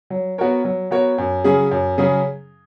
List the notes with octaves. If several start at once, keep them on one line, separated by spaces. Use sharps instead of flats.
F#3
B3 F#4 A#4 C#5
F#3
B3 F#4 A#4 C#5
F#2
C#3 F#3 C#4 G#4
F#2
C#3 F#3 C#4 G#4